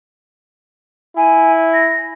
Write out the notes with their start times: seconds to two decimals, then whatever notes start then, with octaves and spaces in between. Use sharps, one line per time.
1.17 E4 G#5
1.74 A#6